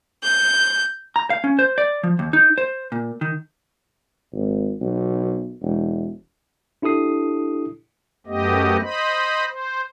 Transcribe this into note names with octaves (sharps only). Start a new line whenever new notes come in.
G6
A#5
F5
C#4
C5
D5
F3
D#2
D#4
C5
A#2
D#3
G#1
B1
E1
D4 E4 G4 A4 D#6 C7
F#2 A3 B3 G4 D#5
C5 D#5 B5
C5